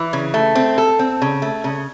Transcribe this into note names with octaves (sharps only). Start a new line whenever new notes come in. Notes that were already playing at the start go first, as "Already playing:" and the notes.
Already playing: E3
C#3
A3
C4
A4
C4
C#3
A3
C#3